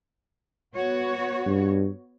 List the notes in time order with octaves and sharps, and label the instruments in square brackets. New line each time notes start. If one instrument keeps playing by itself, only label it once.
[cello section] B3 F#4 C#5
[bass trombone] G2